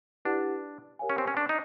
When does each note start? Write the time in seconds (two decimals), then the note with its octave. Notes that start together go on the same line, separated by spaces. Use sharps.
0.25 D4 E4 G4 B4 D5 F#5
0.99 G4 A#4 C#5 F5 G#5
1.10 C#4
1.18 C4
1.27 C#4
1.37 D4
1.49 D#4